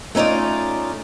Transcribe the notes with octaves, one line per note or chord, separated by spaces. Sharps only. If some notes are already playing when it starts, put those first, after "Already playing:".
A3 C#4 D#4 F4 D5